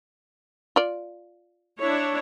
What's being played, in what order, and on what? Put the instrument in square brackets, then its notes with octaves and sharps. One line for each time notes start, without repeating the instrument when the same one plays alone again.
[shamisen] F4 D5
[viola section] D4 E4 C#5